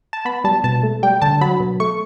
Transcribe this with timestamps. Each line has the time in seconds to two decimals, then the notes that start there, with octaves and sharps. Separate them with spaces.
0.13 A5
0.25 B3 B5
0.44 G3 A5
0.64 B2 A5
0.83 A3
1.03 G3 G5
1.22 D3 A5
1.41 F#3 B5
1.60 B2
1.80 A3 C#6